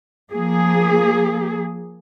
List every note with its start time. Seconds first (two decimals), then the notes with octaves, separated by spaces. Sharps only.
0.32 F3 A#3 G#4